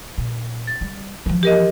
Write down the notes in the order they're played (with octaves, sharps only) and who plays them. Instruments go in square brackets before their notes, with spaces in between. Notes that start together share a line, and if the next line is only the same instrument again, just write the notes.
[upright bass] A#2
[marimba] A6
[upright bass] G3
E3 F3
[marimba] G4 A#4 D#5